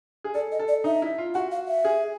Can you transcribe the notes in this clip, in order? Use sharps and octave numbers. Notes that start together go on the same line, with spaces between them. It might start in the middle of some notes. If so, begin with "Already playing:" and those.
G#4
A4 D5
D#5
A4
D5
D#4 E5
E4
F4
F#4 F#5
F5
E5
G#4